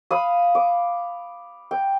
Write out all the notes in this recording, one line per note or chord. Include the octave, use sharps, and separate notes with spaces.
F5 B5 D#6
D6
G5